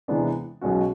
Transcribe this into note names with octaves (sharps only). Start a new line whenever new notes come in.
C3 E3 G#3 B3 D4
B1 B2 G#3 C#4 F#4